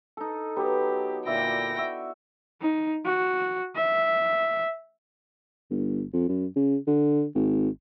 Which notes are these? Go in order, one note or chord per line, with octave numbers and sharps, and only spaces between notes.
D#4 A4
F#3 B3 G4
D2 A#2 E4 D5 E5 G5 A#6
F#4 E5
D#4
F#4
E5
G1
F2
F#2
C#3
D3
G#1